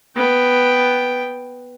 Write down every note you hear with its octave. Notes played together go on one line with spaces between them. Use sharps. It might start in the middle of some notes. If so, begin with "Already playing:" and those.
B3 G5